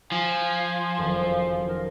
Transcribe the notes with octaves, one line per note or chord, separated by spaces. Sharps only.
F3 F4 G#5
F#1 F2 D#3
D#4 A#4